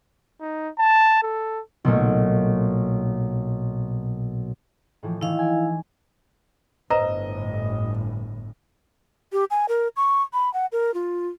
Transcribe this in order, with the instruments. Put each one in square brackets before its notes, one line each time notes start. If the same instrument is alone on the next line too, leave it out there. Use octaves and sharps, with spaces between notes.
[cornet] D#4
A5
A4
[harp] B1 A#2 A3
A2 E3 F3
[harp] D#3 E3 [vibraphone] E4 F5
[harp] G#5 D7
[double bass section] G1 A2 [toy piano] B4 C5 A#5 [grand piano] D#5
[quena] G4
G#5
A#4
C#6
B5
F#5
A#4
F4